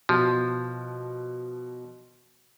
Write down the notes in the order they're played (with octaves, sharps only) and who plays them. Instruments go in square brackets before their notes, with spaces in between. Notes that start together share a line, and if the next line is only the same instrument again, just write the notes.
[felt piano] B2 [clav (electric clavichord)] F3